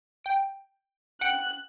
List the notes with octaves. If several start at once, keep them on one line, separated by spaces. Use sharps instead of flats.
G5 D7
F#5 G5 F#6